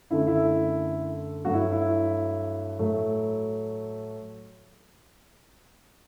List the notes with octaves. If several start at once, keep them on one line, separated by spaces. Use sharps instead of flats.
F#2 D3 A3 E4
E4
G2 F#3 A3 F#4
E4
E4
A2 F#3 A3